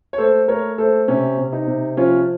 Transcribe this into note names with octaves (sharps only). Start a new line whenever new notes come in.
C#5
A3 A4 C5
A3 A#4 C#5
A3 A4 C5
C3 C#4
C3
D#4
C3
F3 C#4 F4